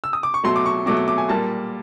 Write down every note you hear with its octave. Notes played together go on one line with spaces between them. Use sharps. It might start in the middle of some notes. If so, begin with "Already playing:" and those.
E6
D#6
D6
C#6
B2 F#3 A3 C6
D6
C#6
B2 F#3 A3 D6
D6
D6
G#5
A#2 G3 A#3 A5